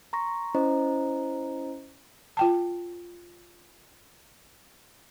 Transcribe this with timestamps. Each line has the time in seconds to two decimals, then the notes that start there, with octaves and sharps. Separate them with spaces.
0.13 A#5 C6 C#6 A#6
0.54 C#4 E4 C5 D#5 A#5
2.37 F4 G5 A5